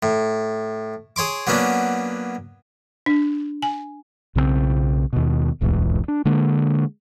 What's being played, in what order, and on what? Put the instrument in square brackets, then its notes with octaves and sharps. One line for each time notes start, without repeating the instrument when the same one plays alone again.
[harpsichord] A2
G#4 C#5 C6 D6
F#3 A#3 B3 C#4 D4
[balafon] D4
G#5
[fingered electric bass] B1 C#3 G3 C4
D#2 B2
D1 B1 E2 G#2
D4
D3 G#3 A#3